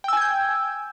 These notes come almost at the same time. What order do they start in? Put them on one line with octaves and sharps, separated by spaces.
G5 E6 G#5 G#6 G6